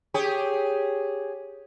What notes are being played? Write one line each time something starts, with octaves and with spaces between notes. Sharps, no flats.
G4 G#4 C#5